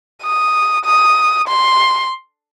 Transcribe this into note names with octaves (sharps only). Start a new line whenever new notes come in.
D#6
D#6
C6